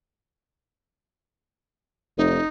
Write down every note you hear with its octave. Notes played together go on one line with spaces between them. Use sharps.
F1 D#4